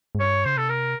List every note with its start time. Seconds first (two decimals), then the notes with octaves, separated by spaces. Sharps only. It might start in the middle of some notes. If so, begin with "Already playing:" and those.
0.15 G#2
0.19 G2 C#5
0.45 C#3 C5
0.56 C3 A4
0.69 A#4